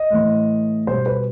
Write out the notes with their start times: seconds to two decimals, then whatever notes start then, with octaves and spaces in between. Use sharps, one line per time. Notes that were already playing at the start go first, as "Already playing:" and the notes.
Already playing: D#5
0.10 A2 E3 A3
0.87 B2 G3 C5
1.06 B4